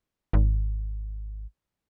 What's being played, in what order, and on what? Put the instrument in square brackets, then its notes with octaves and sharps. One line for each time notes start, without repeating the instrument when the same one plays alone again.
[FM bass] G#1